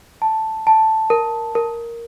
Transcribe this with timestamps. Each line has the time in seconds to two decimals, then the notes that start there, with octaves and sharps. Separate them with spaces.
0.22 A5
0.67 A5
1.10 A#4
1.55 A#4